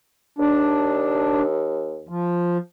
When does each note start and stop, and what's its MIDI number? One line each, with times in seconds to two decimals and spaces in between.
0.39 2.05 39
0.39 1.42 62
2.09 2.58 53